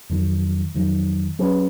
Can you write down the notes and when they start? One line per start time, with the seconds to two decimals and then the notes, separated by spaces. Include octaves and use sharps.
0.10 F2 D#3 F#3
0.75 F2 D#3 F#3
1.39 F#3 C#4 G#4 B4